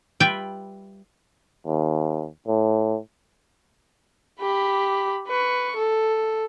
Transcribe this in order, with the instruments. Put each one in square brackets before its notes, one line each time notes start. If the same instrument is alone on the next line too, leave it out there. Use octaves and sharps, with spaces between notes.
[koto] G3 F4 B4 E5 G5
[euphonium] D#2
A2
[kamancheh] G4 B5
B4 C#6
A4